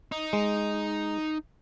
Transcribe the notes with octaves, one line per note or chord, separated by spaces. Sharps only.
D#4
G#3